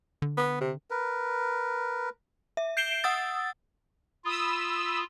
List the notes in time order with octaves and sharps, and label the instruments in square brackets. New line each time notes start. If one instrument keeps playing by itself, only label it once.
[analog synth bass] D3
[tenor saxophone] B3
C3
[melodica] A#4 B4
[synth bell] E5
G6 C7 D7 E7 G7
F#5 D#6 E6 A6
[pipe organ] F4 [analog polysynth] B5 D#6 E6